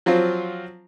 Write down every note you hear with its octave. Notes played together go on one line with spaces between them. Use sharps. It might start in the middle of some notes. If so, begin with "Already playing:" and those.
F3 F#3 C4 F4